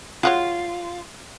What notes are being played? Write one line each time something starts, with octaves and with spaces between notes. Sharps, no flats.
G#3 F4 F#4 C#5